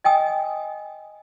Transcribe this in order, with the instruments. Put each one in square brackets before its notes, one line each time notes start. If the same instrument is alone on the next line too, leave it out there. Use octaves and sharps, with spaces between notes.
[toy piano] D#5 G5 G#5 D#6